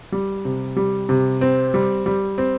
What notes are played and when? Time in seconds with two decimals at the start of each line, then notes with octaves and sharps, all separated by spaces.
0.12 G3
0.45 C3
0.76 G3
1.09 C3
1.41 C4
1.74 G3
2.06 G3
2.38 C4